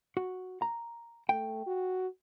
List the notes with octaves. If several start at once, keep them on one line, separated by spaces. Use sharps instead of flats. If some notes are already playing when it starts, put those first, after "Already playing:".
F#4
A#5
A3 G5
F#4